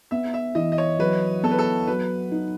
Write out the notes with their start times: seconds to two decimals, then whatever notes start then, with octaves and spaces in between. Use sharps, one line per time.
0.11 B3 E5
0.34 E5
0.55 E3 D#5
0.72 D#5
0.78 C#5
0.99 F#3 B4
1.43 B3 A4
1.51 B4
1.59 A4
1.87 F#3 B4
2.32 D#4